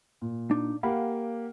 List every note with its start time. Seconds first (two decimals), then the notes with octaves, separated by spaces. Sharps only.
0.22 A#2
0.51 D4 D#4
0.83 A#3 G4 F5 F#5 B5